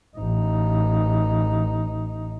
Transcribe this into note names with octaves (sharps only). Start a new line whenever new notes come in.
A1 D#4